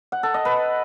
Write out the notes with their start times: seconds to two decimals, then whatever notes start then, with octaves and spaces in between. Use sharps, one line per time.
0.12 F#5
0.23 A4
0.34 D#5
0.45 B4